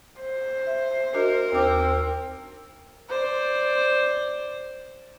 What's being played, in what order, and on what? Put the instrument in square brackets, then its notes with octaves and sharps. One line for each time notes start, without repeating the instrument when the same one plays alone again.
[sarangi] C5
[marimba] E5
[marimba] D4 F#4 D#5 [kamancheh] A#4
[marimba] D#2 D6 [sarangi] C4
[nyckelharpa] C5 D5